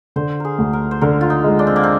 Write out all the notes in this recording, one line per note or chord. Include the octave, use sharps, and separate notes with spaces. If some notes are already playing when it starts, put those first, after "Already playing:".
D3 C5
G#4 A#4
D2
A#4
C5
D3 A#4
F4
D#4
G#3
D4
C4
A#3
C4